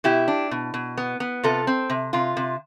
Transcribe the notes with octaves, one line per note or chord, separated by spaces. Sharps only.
B2 E4 G4
D4
B2
B2
B3
B3
C3 F4 A4
C4
C3
C3 F4
C3